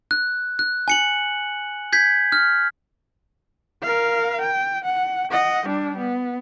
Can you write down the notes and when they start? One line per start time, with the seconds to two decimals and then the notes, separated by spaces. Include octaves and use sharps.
0.11 F#6
0.59 F#6
0.88 G#5 C#7 F#7
1.93 G6 G#6 B6
2.32 F6
3.82 A#4 F5
4.42 G5
4.84 F#5
5.31 D#5 F#5
5.66 G3 D4
5.98 B3